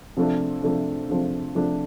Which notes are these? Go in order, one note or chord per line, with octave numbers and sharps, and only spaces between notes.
C3 F3 A3 D4
C3 F3 A3 D4
C3 F3 A3 D4
C3 F3 A3 D4